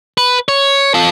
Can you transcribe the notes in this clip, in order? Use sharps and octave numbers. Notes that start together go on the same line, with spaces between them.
B4
C#5
F4 A4